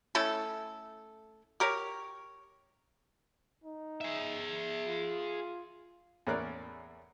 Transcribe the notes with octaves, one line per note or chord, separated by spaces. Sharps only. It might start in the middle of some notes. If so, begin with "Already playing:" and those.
A3 C#4 E4 A4
G4 A#4 C#5
D#4
G#4 E5
F4
E2 A2 C#4 A#4 D5 F#6